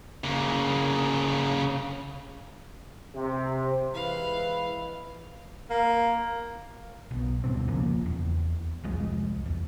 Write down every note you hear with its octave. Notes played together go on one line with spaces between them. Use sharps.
C#3 A#3
C3
E3 G#3 E4 B4 F5
A#3
B1 B2
D2 G2 B2 C4
A#1 C#3 F3 A#3
E2
C2 F2 G#3
E2